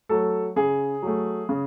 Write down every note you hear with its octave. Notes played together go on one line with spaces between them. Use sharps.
F#3 A3 A4
C#3 G#4
F#3 A3
C#3